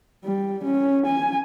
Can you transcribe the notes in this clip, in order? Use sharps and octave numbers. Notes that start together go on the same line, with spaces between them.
G3
C#4
G#5